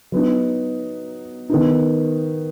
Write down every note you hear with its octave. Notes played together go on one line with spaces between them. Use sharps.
F#3 B3 D#4
D#3 B3 D#4